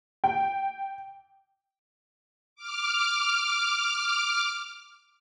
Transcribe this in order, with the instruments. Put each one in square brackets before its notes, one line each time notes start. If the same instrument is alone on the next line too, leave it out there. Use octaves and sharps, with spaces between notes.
[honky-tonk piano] G5
[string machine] D6 F6